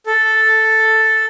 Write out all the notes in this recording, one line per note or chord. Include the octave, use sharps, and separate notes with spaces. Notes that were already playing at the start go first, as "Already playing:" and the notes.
A4